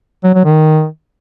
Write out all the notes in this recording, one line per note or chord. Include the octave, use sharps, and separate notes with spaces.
F#3
F#3
D#3